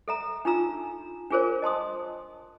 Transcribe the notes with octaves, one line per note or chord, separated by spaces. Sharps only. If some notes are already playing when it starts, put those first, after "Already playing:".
A4 E5 A#5
D4 D#4 F4 A#5 E6
D4 F4 G#4 A#4 C5 C#5
D#5 A5 C6 D#6